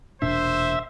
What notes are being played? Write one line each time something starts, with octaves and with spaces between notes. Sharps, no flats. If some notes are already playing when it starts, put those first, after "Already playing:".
E1 A#2 D4 C5 E5